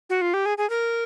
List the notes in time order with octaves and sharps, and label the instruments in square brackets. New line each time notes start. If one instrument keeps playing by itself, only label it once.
[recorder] F#4
F4
G4
G#4
G#4
A#4